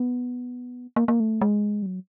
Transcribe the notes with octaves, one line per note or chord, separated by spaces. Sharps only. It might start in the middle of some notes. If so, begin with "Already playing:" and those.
Already playing: B3
A#3
A#3
A3
G#3
G3
F#3